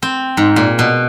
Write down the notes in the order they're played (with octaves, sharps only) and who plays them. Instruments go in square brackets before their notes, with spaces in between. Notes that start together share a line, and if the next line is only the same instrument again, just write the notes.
[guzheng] C4
G#2
A#2
B2